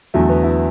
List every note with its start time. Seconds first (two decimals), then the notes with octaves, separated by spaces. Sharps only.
0.14 E2 D3 F#3 A3
0.29 B3
0.44 E4